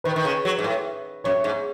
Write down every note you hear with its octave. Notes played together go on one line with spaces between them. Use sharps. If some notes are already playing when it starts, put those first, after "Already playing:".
D#3 B4
D#3
C#3
F#3
G#2
A2
F#2 C#5
G#2